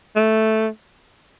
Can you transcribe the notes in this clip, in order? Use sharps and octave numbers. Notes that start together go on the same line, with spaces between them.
A3